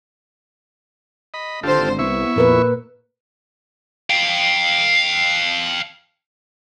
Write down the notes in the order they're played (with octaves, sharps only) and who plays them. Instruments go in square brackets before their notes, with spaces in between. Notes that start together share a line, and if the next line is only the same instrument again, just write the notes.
[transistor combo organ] D#5 B5
[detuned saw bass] G#1 [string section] D3 C5 [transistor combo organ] F4 G4 A4
[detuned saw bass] C2 [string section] B3 [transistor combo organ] E4 E5 C#6
[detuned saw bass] F2 [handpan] A#2 A#4 B4
[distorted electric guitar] F5 G5